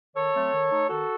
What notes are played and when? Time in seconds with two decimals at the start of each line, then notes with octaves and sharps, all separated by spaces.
0.16 D#3 A4 C#5
0.34 F#3 A3 C4
0.53 D#3
0.71 A3 D#4
0.89 D#3 F#4 A4